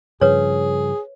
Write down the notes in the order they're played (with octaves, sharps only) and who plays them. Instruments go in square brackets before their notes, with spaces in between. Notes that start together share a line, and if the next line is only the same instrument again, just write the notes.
[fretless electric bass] G2 C#3 F3 [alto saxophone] G#4 [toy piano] B4 C#5